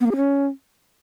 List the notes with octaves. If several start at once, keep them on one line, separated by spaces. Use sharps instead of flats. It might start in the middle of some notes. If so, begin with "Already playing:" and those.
B3
A#3
G#4
C#4